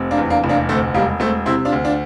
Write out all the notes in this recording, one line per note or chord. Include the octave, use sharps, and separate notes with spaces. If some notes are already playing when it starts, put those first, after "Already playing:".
Already playing: F1 C3
A#3 D4
E2
A#3 D4
F1
A#3 D4
D2 A3 C4
E1 G3 A#3
E1 A3 C4
C3 C4 E4
D4 F4
D2
D4 F4